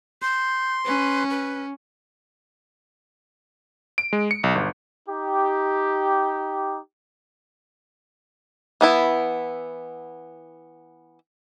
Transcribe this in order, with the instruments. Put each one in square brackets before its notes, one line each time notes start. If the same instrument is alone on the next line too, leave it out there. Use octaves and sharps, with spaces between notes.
[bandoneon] C6 [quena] G6
[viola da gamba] C#4 [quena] B4
[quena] B4
[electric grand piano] D7
G#3
C#7
B1
G1
[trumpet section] D#4 G4
[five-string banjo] E3 B3 E4